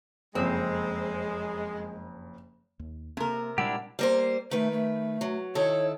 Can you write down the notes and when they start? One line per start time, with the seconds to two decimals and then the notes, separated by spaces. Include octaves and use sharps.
0.35 F#1 F2 G#3 C4
2.79 D#2
3.17 C3 A#3 C4 A#4
3.58 A#2 G3 G#3 D4 E4 G4 F#5
3.99 G3 A#3 C5
4.51 D#3 A3 B4
4.72 A3
5.21 F#3
5.55 D#3 E4 A4 C#5